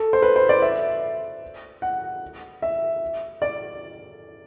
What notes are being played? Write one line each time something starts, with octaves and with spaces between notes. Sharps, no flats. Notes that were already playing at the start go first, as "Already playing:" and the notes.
Already playing: A4
C5
B4
C5
D5
E5
F#5
E5
D5